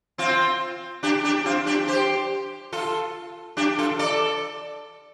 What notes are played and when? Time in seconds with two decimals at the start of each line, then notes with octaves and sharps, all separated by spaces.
0.18 C4 F4
1.03 D4 G4
1.24 D4 G4
1.46 C4 F4
1.66 D4 G4
1.88 G4 C5
2.72 F4 A4
3.57 D4 G4
3.78 F4 A4
3.99 A4 D5